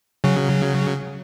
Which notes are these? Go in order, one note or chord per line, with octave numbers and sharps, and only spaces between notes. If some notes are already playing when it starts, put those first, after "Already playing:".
C#3 F#3